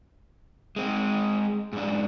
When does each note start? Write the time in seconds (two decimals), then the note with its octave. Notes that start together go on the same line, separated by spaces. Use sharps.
0.76 G#3 C4
1.73 G#2 D4